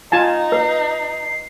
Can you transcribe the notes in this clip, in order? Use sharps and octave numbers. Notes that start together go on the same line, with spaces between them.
D#4 F4 G#5 A5
B4 C7